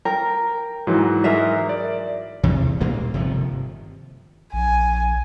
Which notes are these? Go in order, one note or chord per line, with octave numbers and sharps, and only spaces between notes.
A#4 G5
G#2 E3 F#3
G#4 A#4 E5
D5
E2 C3 E3
G2 A#2 A#3
G1 C3 D#3 F3
A#1 G#5